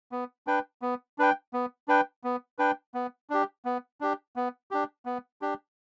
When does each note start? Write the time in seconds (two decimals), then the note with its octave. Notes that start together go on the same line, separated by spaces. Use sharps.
0.12 B3
0.47 D4 B4 G5
0.82 B3
1.18 D4 B4 G5
1.53 B3
1.88 D4 B4 G5
2.24 B3
2.58 D4 B4 G5
2.94 B3
3.30 D4 G4
3.65 B3
4.01 D4 G4
4.36 B3
4.71 D4 G4
5.05 B3
5.42 D4 G4